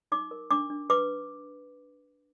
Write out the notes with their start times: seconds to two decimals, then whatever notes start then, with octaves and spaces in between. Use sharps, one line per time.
0.12 D#4 D6
0.31 A#4
0.51 D4 D6
0.70 D4
0.90 B4 D6